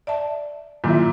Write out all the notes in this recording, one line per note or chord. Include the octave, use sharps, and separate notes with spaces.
D5 E5 A5
A#2 D#3 F#3 E4